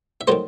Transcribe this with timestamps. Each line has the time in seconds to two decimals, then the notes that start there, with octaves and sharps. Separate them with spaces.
0.21 E5
0.27 D#3 F#3 A3 C5 D#5